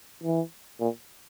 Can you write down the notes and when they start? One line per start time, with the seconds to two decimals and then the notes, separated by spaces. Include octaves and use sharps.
0.24 E3
0.80 A#2